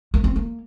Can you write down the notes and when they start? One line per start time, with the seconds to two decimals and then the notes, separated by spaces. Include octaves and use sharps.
0.14 A#3
0.24 C4
0.36 A#3